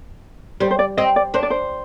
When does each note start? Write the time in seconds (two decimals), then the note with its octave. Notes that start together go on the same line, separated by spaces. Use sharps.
0.60 G3 C5
0.71 C5
0.79 D5
0.97 C4 D#5
1.16 D5
1.34 D4 C5
1.43 D5
1.50 C5